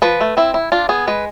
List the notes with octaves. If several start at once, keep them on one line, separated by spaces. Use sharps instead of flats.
F3 B4
A3
C4 E4
E4
D4 F4
B3 G#4
G#3 B4